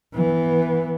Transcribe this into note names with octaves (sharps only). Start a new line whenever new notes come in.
E3 B3